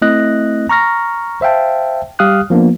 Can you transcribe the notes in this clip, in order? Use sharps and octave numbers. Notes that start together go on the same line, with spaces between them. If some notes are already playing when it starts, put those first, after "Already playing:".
A3 C4 E4 D#5 F#6 A#6
A#5 C#6 F6 A#6
C5 E5 F5 G5 A5
G3 G4 F5 D#6 F6 F#6
F3 A#3 B3 D4